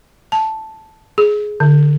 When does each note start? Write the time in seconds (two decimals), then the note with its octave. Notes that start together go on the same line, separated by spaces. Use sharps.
0.32 A5
1.18 G#4
1.60 D3